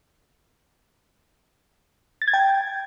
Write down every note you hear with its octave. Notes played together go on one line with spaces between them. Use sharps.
A6
G#6
G5